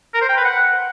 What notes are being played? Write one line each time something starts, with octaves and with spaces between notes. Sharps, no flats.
A#4
C5
G5
B4
F#5